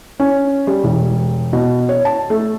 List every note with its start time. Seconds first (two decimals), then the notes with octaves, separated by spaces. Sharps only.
0.20 C#4
0.67 G3
0.84 E1
1.53 B2
1.89 C#5
2.05 A5
2.30 A3